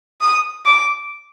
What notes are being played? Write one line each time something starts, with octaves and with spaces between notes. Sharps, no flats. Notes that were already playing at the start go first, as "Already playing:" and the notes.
D#6
D6